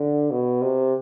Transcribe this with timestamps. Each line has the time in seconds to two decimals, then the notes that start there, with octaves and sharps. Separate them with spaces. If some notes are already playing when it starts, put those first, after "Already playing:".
Already playing: D3
0.31 B2
0.62 C3